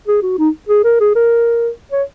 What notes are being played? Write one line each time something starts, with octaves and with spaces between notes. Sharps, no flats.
G#4
F#4
D#4
G#4
A#4
G#4
A#4
C#5